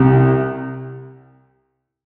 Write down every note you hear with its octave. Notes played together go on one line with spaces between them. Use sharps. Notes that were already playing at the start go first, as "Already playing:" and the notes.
Already playing: C2 C3